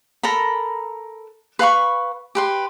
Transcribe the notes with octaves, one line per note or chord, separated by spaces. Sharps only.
A4 A#4 A#5 B5
B4 F5 B5 C#6
G4 B4 C6